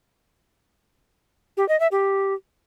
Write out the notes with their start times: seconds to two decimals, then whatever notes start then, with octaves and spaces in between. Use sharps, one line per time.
1.57 G4
1.69 D#5
1.80 E5
1.91 G4